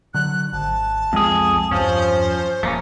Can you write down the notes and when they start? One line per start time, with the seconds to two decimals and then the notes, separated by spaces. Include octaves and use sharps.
0.14 D3 F#3 F#6
0.53 G#1 A5
1.13 C2 F2 G#3 G#4
1.71 E2 G2 F3 C#4 C5
2.63 D#1 F3 A3 A#3 C#4